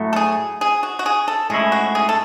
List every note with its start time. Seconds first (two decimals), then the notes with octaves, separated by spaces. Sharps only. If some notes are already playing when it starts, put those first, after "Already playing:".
Already playing: A2 F#3 A3
0.13 A4
0.16 G#4
0.61 G#4
0.83 F#4
0.99 F#4
1.06 G#4
1.28 A4
1.50 A2 G#3 C#4 E4 G#4
1.72 F#4
1.95 G#4
2.09 A4